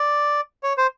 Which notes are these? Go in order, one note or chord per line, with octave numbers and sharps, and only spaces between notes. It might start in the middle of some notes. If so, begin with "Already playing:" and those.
Already playing: D5
C#5
C5